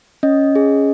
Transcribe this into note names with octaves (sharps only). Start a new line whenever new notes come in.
C#4 D#5
G#4